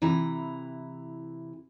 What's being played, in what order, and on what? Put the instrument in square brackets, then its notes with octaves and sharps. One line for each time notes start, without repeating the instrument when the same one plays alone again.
[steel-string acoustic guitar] C3 E3 E4 A#5